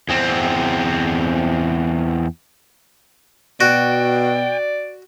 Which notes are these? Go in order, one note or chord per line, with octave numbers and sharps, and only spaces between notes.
E2 C4
B2 F#4 D5 G5